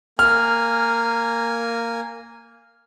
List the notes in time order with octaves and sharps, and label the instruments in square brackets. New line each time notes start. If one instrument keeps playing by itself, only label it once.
[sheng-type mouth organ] A#3 G#5 [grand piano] F6